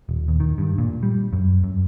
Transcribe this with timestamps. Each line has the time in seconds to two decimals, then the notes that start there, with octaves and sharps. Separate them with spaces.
0.09 D#1
0.28 D#2
0.40 D#3
0.58 G2
0.78 A#2
1.03 G3
1.33 F#2
1.64 F#2